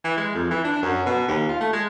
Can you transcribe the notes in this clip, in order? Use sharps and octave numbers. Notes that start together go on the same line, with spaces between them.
E3
G#3
F2
E3
D4
F#2
B2
D#2
F4
A3
G#3